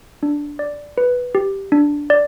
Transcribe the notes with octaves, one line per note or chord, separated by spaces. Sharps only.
D4
D5
B4
G4
D4
D5